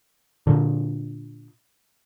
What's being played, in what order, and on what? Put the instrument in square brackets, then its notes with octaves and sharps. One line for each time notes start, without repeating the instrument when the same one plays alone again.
[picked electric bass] A#2 D3